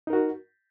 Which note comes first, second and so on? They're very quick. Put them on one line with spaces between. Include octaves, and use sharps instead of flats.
D#4 A#4 F#4